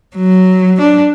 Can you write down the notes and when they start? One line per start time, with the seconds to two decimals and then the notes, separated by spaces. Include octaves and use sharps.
0.16 F#3
0.80 D4